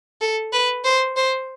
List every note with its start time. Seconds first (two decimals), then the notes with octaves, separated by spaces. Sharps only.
0.21 A4
0.53 B4
0.85 C5
1.17 C5